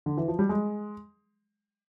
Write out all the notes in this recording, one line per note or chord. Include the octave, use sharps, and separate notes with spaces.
D3
E3
F3
G3
G#3